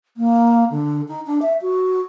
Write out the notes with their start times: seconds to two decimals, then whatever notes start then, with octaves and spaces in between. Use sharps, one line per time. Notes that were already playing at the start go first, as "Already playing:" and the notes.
0.17 A#3
0.70 D3
1.08 D#4
1.26 D4
1.42 E5
1.61 F#4